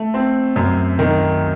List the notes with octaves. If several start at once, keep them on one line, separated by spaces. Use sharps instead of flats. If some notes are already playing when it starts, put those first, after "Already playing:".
Already playing: A3
C4
F#2
D#3